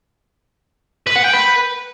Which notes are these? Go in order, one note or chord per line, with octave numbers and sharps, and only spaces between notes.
B4
F#5
G5
B4